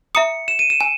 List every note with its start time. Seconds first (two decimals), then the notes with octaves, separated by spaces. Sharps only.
0.15 E5 A#5 D#6 C#7
0.48 E7
0.59 D#7
0.70 E7
0.81 G#5